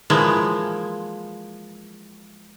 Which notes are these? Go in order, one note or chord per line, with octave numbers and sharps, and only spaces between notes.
E3 F3 G#3 A#3